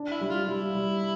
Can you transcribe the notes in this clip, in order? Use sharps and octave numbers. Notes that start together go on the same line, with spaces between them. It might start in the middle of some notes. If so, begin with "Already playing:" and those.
Already playing: D4
E4
G3
F4
G3 E4
G3